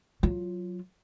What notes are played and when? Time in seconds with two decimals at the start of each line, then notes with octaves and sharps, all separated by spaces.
0.23 F#3 F4